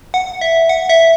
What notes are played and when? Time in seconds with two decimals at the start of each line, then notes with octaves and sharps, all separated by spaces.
0.14 F#5
0.41 E5
0.69 F#5
0.89 E5